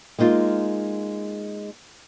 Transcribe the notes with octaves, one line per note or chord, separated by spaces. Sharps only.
G#3 A#3 D#4 F4